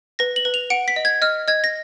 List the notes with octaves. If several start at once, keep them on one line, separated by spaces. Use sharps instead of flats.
B4 A#6
F#7
B4
F7
F#5 D7
B6
D#5
G#6
D#5 F6
D#5 G#6
A#6